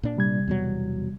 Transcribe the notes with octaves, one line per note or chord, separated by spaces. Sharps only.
A#2 D4
C3 G3 G#6
E2 B2 F#3